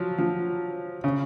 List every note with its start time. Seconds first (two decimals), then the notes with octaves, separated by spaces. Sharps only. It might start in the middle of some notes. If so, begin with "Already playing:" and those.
Already playing: F3 F#3
0.19 F3
1.04 C#3